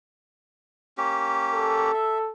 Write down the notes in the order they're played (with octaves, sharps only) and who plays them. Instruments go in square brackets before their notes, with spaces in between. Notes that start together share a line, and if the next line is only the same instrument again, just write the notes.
[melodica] A#3 C#4 G4
[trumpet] A4
[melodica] E5